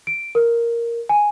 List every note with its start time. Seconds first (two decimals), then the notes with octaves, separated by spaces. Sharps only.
0.07 D7
0.35 A#4
1.09 G#5